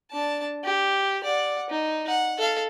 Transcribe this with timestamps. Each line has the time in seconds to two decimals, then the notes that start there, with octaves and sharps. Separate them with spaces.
0.11 D4 A5
0.64 G4
1.23 D5 F#5
1.70 D#4
2.07 F#5
2.38 A4 F5